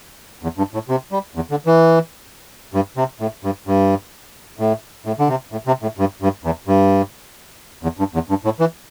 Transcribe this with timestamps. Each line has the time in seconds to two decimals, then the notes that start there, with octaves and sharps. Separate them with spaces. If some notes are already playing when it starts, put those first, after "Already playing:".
0.43 E2
0.58 G2
0.74 A2
0.89 C3
1.12 G3
1.35 E2
1.51 D3
1.66 E3
2.74 G2
2.97 C3
3.20 A2
3.44 G2
3.67 G2
4.59 A2
5.06 A2
5.19 D3
5.28 C3
5.52 A2
5.67 C3
5.82 A2
5.98 G2
6.22 G2
6.44 E2
6.67 G2
7.83 E2
7.99 G2
8.14 E2
8.29 G2
8.45 A2
8.60 E3